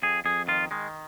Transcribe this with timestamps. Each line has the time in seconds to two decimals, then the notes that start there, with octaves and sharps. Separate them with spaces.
0.02 F2 G#4
0.25 F2 G#4
0.48 D#3 F4
0.71 D#3 G#3